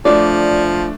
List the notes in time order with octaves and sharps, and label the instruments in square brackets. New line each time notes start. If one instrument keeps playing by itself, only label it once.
[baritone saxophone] F3 [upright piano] A3 D4 [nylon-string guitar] D5